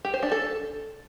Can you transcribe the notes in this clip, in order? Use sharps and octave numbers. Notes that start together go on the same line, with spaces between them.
G4
C5
D4
A4